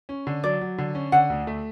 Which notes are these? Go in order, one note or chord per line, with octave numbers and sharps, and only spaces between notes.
C#4
D3
F#3 D5
F#3
D3
C#4
D3 F#5
D2
A3